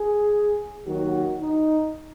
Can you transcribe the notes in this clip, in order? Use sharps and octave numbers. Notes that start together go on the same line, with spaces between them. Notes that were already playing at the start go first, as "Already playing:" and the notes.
Already playing: G#4
D#2 D#3 F#3 F#4
D#4